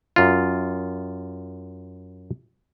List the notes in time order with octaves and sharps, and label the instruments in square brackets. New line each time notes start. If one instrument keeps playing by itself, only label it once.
[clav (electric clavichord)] F#2 F4